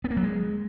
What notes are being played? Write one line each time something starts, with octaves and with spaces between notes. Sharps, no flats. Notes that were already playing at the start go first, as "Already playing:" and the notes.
B3
A#3
F#3
G#3